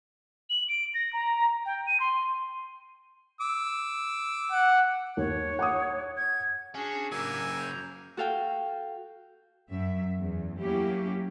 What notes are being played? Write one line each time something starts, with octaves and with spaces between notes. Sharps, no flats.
F#7
D7
A#6
A#5
G5
D#7
C6
D6 E6
F#5
D#2 C#5
F#5 D6 D#6
G#6
C#4 D4 F#4 G#4
A2 C#3 F#3 A#3 G4 G#5 E6
A#5 G6
F#4 A4 F5 G5
F#2 E5
E2
F#3 A#3 C#4 E4 G4